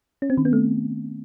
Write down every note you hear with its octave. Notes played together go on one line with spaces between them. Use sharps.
C#4
C4
D#3
B3
A3